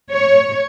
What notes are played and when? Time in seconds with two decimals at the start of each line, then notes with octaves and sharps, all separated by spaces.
0.12 C#5